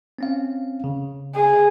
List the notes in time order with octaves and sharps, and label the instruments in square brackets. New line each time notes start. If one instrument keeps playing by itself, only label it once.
[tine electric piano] C4 C#4 F5
C#3
[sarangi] G#4